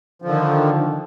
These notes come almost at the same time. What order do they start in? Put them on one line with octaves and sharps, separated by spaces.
F3 D3 D#3